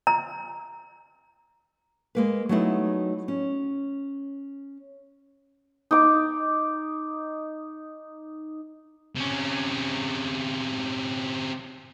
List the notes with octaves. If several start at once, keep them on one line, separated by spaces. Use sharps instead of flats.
A#5
G#3 A#3 B4
F#3 G3 A3 B3 D#4 E4
C#4
D#4 D6
C3 C#4